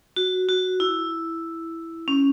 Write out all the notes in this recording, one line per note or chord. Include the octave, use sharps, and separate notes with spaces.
F#4
F#4
E4
C#4